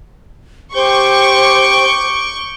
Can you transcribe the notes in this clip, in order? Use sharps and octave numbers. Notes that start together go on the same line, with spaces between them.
G4 C5 C#6 D6 G6